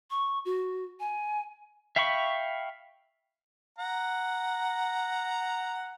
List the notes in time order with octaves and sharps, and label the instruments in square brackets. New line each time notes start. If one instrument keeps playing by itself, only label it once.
[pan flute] C#6
F#4
G#5
[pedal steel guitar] E5 F5 G5 B5 C#6
[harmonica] F#5 A#5